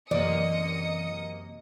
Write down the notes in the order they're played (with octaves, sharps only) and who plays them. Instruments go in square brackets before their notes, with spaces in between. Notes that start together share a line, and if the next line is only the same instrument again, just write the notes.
[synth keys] F#2 C3 A#3 [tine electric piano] E3 [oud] D5 [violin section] D#5 D#6 C#7